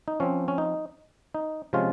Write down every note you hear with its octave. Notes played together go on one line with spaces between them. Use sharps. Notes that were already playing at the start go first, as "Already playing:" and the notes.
D#4
F3 C4 C#4
C#4
D#4
D#4
C3 F3 G#3 C#4 F4